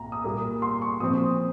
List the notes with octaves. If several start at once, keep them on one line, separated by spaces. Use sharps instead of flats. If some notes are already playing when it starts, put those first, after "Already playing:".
Already playing: C2 A#2 A#5
D#6
A#2 G3 A#3
C6
C#6
A#2 F3 C4 D#6